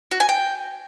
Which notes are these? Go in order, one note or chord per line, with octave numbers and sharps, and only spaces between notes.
F#4
G#5
G5